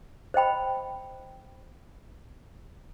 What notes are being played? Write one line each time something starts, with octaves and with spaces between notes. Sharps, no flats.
C5 D#5 G5 B5